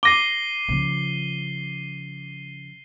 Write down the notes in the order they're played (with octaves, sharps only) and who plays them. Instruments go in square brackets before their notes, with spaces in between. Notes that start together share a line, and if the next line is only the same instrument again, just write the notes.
[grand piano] D6 A#6 [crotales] C7 D#7 G7
[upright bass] C#3 F3